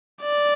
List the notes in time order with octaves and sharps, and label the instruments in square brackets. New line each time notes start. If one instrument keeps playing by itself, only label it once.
[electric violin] D5